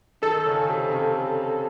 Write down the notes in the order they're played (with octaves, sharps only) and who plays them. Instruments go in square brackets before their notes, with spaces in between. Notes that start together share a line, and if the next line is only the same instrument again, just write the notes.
[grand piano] D#3 D#4 [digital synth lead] A4
[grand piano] C#3 C#4
C3 C4
C#3 C#4